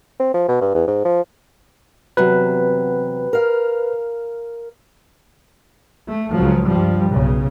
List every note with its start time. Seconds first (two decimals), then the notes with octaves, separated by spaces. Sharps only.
0.19 C4
0.34 F3
0.48 B2
0.61 G2
0.75 E2
0.88 G#2
1.05 F3
2.17 E2 C3 F#3 B4
3.33 A#4 F5
6.08 A3
6.36 C#2 C#3 F3 F#3
6.68 G2 F3 G3
7.11 B1 C#3